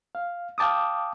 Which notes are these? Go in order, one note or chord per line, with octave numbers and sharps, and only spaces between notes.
F5
F5 G5 A5 D6 D#6